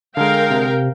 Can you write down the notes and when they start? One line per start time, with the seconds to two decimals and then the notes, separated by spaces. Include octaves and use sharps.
0.17 D3 G#3 A#4 F5 G5
0.50 C3